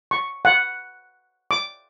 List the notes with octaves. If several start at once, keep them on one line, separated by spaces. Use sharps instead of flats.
C#6
F#5
D6